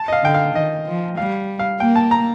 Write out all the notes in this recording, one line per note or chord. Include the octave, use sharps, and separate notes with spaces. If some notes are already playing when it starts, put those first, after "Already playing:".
Already playing: A5
D#5
F5
D3 G5
F5
D#3 D#5
F3
G3 F5
F5
A#3 G5
A5
A#5